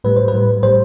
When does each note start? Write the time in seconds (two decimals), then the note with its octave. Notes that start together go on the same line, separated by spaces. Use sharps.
0.04 A2 G3 B4
0.16 C5
0.28 B4
0.33 A2 G3
0.63 A2 G3 C5